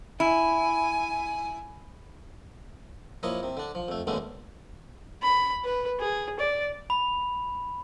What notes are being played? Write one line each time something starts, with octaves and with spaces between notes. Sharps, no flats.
E4 G#5
F3 A#3 E4 C#5 D#5
C3
D3 D4
F3
F2 A3
D#2 B2 D3 G#3 A3 C#4
B5
B4
G#4
D5
B5